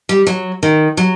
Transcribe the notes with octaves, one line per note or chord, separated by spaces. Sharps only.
G3
F#3
D#3
F#3